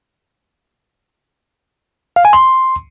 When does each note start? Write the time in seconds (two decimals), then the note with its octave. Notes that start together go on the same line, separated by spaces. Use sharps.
2.16 F5
2.25 G#5
2.33 C6